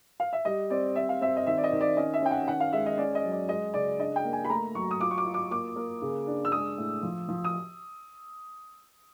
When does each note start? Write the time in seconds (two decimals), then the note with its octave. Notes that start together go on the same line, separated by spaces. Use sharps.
0.20 F5
0.33 E5
0.45 G3 D#5
0.70 C4 D5
0.95 C4 E5
1.09 F5
1.21 C4 E5
1.36 D#5
1.46 D#3 E5
1.57 D5
1.64 D#5
1.72 D#3
1.81 D5
1.97 C#4 D#5
2.14 E5
2.22 C#4 G5
2.31 F#5
2.48 D#3 F#5
2.60 F5
2.73 G#3 E5
2.86 D#5
2.98 C#4 D5
3.15 D#5
3.24 F#3
3.32 D5
3.49 G#3 D#5
3.74 C#3 D5
3.99 D4 D#5
4.16 G5
4.24 A#3
4.33 G#5
4.45 B5
4.50 A3 A#5
4.75 F#3 C#6
4.91 D#6
5.01 F4 D6
5.11 C#6
5.18 D6
5.26 F4
5.34 D6
5.51 A#3 D6
5.76 A#3
6.02 C#3
6.27 D4
6.45 E6
6.52 G#3 D#6
6.78 A2
7.03 F3
7.29 F3
7.44 D#6